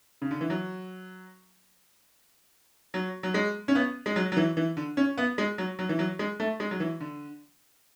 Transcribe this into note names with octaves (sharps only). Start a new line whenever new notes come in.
C#3
D3
E3
F#3
F#3
F#3
G#3
C#4
B3
G#3
F#3
F#3
E3
E3
D3
C#4
B3
G#3
F#3
F#3
E3
F#3
G#3
A3
G#3
F#3
E3
D3